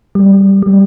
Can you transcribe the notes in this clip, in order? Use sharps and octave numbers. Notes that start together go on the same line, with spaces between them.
G3
G3